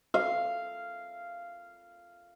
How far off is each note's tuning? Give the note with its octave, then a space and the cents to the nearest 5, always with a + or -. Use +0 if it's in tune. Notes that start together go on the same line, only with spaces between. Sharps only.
F5 -10